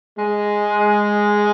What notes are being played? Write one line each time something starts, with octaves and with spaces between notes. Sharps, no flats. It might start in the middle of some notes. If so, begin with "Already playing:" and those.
G#3